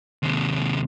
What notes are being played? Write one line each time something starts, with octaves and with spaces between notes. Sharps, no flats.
D#2 C3